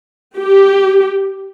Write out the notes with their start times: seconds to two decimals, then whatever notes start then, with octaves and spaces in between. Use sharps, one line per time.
0.38 G4